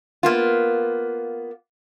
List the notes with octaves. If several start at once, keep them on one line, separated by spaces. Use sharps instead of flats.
A#3 B3 F4